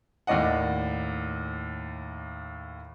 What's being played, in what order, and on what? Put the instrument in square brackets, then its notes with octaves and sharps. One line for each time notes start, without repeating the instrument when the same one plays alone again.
[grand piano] D#2 A2 D5 D#5 F#5